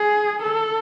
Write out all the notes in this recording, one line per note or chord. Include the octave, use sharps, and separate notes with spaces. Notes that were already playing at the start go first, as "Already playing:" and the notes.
Already playing: G#4
A4